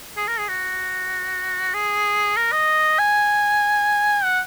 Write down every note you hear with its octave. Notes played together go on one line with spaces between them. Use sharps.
G#4
A#4
G#4
F#4
G#4
A#4
D#5
G#5
F#5